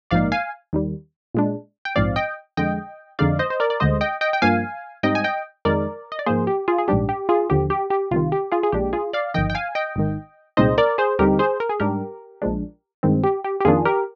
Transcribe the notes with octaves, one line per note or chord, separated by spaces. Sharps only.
A#1 G#2 F3 A#3 D#4 D5 F5
F5 G#5
D#2 D#3 G3
A#2 G#3 D4
G5
A#1 G#2 F3 C4 D5 F5
D#5 G5
F2 D3 G#3 D#5 G5
F2 D3 G#3 D#4 D5 F5
C5 D#5
C5
A#4 D5
D5
D2 D3 G#3 C5 D#5
D#5 G5
D#5 G5
G5
G2 F3 A#3 F5 G#5
G#2 G3 C4 D#4 D#5 G5
G#5
D#5 G5
F2 D#3 G#3 D#4 A#4 D5
D#5
D5
G#2 F3 A#3 G#4 C5
G4
F4 G#4
G#4
A#1 G#2 G3 D4 G4
G4
F4 G#4
D#2 D3 F3 G4
G4
G4
C2 C3 D#3 F4
G4
F4 G#4
G#4
A#1 A#2 G#3 D4 G4
F4 G#4
D5 F5
G1 F2 D#3 D#5 G5
G5
F5 G#5
D#5 G5
G#1 G#2 D#3
C2 A#2 G#3 C4 D#4 C5 D#5
A#4 D5
G#4 C5
D#2 D3 G3 C4 D#4 G4 A#4
G#4 C5
A#4
G#4
G#2 G3 D4 G4 A#4
A#1 A#2 F3 G#3 D4
G2 D#3 G#3 C4
G4
G4
G4
F2 D#3 A#3 D4 F4 G#4
G4 A#4